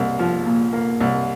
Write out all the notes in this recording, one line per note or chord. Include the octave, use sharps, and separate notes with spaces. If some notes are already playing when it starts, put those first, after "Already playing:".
Already playing: C2 A#3
F3
A#2
A#3
C2